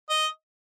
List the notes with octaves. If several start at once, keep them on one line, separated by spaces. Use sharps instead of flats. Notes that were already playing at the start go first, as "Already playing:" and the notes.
D#5